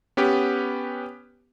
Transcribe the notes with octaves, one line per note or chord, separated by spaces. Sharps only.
B3 C#4 G4 B4